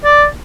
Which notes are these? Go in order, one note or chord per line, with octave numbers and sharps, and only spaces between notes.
D5